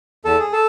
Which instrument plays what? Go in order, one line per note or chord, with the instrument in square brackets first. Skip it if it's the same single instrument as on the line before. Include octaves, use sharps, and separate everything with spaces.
[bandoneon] E2 A4
G#4
A4